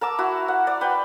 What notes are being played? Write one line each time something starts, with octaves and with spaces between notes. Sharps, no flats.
A#4 A5 D6 E6
E4 F#4
F#5
D5
B4 G5